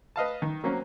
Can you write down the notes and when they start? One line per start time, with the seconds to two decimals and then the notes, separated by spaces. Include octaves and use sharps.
0.16 B4 D#5 F5 A5
0.42 D#3
0.64 F#3 A#3 C4 C#4